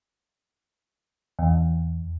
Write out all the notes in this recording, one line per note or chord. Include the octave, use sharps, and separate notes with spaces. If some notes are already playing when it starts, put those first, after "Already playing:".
E2